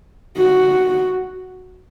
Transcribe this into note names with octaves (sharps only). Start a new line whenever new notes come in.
F#4